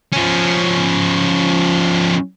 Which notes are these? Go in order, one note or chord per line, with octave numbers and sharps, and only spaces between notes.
F3 C#4